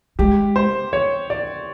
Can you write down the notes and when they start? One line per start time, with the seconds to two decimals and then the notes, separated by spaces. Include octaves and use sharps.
0.19 G#3 G4
0.56 C5
0.93 C#5
1.30 D5